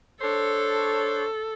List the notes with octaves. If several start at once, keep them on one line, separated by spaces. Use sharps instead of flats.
D4 A4 C5 C#5